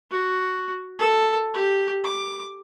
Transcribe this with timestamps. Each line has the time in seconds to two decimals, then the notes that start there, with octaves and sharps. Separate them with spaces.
0.11 F#4
0.99 A4
1.54 G4
2.04 D6